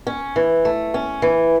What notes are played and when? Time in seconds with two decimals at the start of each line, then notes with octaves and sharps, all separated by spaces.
0.07 C#4
0.36 E3
0.65 A3
0.94 C#4
1.22 E3